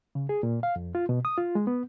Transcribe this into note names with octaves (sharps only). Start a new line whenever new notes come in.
C#3
G#4
A#2
F5
F2
F4
B2
D#6
F4
G#3
B3